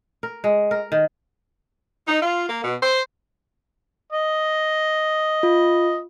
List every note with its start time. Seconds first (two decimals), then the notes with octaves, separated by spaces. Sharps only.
0.23 A#4
0.44 G#3
0.71 A#4
0.92 D#3
2.07 D#4
2.22 F4
2.49 A#3
2.64 B2
2.83 C5
4.12 D#5
5.43 F4